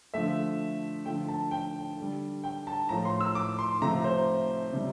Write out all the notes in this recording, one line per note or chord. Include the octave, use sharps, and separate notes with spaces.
D3 F3 A3 E5
D3 F3 A3 G5
A5
G5
D3 G3
G5
A5
A2 F3 A3 A#5
C6
E6
D6
C6
C3 F3 A3 A#5
C5
C3 G3